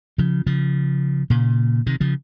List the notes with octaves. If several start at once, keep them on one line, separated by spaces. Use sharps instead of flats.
C#3 F3
C#3 F3
A#2 C#3
C3 D#3
C#3 F3